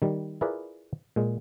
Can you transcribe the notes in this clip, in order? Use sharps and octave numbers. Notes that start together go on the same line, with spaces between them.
D#3 G3
E4 F4 G#4 A#4 B4 D5
A#2 G#3